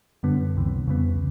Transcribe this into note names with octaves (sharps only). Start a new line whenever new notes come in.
F#2 D3 G3 B3
C#2 C3 E3
F2 C#3 E3 G3 B3